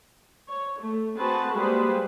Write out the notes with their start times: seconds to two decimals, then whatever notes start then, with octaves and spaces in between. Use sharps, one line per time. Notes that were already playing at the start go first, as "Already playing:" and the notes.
0.48 C#5
0.78 A3
1.17 C4 F#4 G#4 B4 A5
1.51 G3 G#3 A#3 G#4 B4 C5